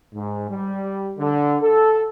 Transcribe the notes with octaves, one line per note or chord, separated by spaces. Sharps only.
G#2
G3
D3
A4